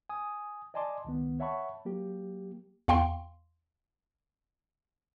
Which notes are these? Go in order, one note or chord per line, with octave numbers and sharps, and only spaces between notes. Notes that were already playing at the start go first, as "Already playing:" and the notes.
G#5 D#6
D5 D#5 G#5 A5 C6 D6
C#2 D#3 B3
C#5 E5 F#5 A5 B5 C#6
F#3 A#3 G4
E2 F5 G5 C6